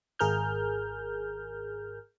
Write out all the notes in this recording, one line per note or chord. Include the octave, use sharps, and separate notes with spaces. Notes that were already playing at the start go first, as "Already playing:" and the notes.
G#1 G#4 A#4 F6 G6